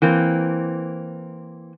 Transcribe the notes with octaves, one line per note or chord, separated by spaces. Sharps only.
E3 A#3 C4